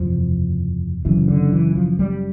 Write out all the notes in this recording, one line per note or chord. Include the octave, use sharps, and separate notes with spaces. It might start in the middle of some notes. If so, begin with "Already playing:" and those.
Already playing: F#1 E2 C3 F3
F#1 F#2 C#3 E3
D3
E3
F3
G3